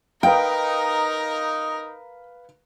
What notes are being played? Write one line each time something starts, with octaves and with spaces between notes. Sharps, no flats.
D#4 A#4 B4 F5 G5